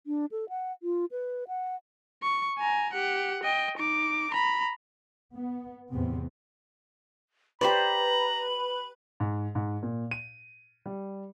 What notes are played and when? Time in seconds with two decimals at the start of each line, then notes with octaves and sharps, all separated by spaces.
0.07 D4
0.31 A4
0.49 F#5
0.83 F4
1.11 B4
1.48 F#5
2.23 C#6
2.59 G#5 A#5
2.93 G4 F#5
3.43 D#5 G5
3.78 D#4 D6
4.31 A#5 B5
5.35 B3
5.91 E2 A2 C3 B3 C4
7.61 G4 B4 C5 D5 A#5 B5 F#7
9.20 G#2
9.55 G#2
9.83 A#2
10.11 D#7
10.86 G3